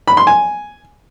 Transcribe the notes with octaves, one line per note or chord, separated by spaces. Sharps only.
B5
C6
G#5